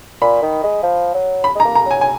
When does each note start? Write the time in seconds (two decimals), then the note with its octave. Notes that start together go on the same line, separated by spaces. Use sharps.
0.21 A#2 B5
0.42 D#3
0.63 G#3
0.83 F3
1.14 F#3
1.44 B5
1.55 G#3 A#5
1.65 A#3
1.75 A#5
1.86 F#3 G#5
2.01 G#5